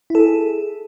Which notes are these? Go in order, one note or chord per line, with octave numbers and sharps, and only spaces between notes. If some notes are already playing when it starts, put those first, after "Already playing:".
E4 G#4 A4